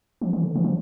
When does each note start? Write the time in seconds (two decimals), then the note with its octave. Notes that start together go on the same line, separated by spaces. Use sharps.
0.21 F3
0.33 E3
0.44 D3
0.55 E3
0.64 F3